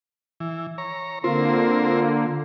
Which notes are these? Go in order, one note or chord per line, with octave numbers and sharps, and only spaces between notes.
E3
C#5 A#5
D3 A#3 C4 F4 A#4 C5